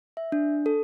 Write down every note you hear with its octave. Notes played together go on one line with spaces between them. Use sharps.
E5
D4
A4